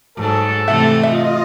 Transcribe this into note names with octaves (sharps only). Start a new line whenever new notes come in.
G#2 F#3 A4
C3 E3 A3 D5 E5 F#5
F4 D#5 E5